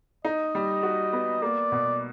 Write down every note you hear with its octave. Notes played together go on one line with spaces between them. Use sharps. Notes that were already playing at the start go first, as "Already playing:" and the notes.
D#4 D#5
G3
F#4
B3
A#3 D5
B2